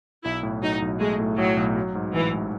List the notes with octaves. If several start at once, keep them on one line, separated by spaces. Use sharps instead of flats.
B1 E4
A2
F#3 D#4
B1
G#3 A3
A2
A2 F#3
B1
F#3
G#2
A1 E3
G#2